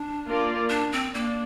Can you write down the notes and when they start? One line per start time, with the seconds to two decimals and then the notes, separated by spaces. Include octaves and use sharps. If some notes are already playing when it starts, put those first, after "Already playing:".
Already playing: D4
0.26 A#3 F4 A#4 D5
0.70 D4
0.92 C4
1.14 A#3 D4